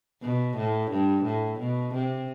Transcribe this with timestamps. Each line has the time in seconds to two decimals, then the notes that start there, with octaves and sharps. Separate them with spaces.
0.22 B2
0.57 A2
0.91 G2
1.25 A2
1.59 B2
1.94 C3